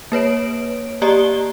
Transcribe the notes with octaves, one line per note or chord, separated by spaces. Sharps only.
A#3 B4 C#5 D7
A#3 G4 D5 D#5 A#5 G7